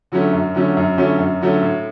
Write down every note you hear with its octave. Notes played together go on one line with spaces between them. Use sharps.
D3 F#3 A3 C#4
F#2
D3 F#3 A3 C#4
F#2
D3 F#3 A3 C#4
F#2
D3 F#3 A3 C#4
A2